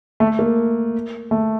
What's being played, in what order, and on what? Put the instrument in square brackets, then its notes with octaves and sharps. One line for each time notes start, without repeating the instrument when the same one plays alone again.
[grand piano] A3
A#3
A3